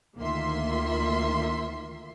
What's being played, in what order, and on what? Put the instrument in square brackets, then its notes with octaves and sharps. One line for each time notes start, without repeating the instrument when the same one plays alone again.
[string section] D2 D#3 A#3 F4 E5 C6